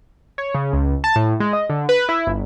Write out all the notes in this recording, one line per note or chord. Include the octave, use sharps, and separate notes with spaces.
C#5
C#3
C#2
A5
A2
G#3
D#5
D3
B4
E4
G1